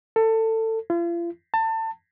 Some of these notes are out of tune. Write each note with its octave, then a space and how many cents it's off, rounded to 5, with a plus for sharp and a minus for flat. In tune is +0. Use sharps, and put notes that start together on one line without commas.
A4 +20
F4 -40
A5 +30